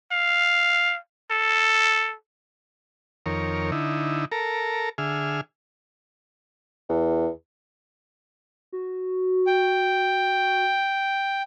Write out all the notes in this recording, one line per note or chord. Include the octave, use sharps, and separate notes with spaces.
F5
A4
F2 D#3 A#4 C#5
D3 D#4 E4
A4 A#4 A#5
D3 G#4 E5 F6
E2
F#4
G5